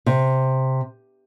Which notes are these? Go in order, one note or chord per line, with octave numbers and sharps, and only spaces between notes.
C3